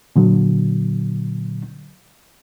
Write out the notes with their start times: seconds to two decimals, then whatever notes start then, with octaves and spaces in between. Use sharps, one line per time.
0.16 A#2 D3 F#3